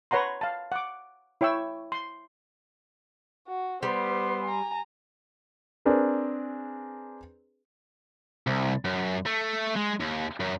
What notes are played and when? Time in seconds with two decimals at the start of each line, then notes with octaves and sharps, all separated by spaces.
0.11 B4 C#5 F#5 A#5 C6
0.41 F5 A5
0.72 F#5 D6
1.41 E4 C#5 G5 C#6 E6
1.92 C6
3.48 F#4
3.83 G3 B3 C5 C6
4.45 G#5 A#5
5.85 C4 D4 G#4 A#4 B4
8.47 C2
8.85 F#2
9.26 A3
9.76 G#3
10.00 D#2
10.40 F#2